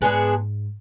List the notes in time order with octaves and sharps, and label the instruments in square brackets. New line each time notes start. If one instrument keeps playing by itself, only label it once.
[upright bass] G#2 [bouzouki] G#3 B3 D4 G#4